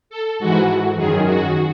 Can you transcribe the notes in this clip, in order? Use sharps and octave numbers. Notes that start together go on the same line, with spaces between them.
A4
G#2 E3 F#4
F#2 D#3 G#4
F#4